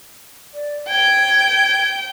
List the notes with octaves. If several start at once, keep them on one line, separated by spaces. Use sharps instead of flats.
D5
G5 G#6